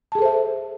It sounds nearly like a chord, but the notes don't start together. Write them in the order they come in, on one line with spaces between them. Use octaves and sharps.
A5 G#4 A4 C5 E5